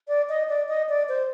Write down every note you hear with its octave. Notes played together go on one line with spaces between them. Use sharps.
D5
D#5
D5
D#5
D5
C5